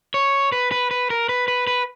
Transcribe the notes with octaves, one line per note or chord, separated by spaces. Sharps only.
C#5
B4
B4
B4
A#4
B4
B4
B4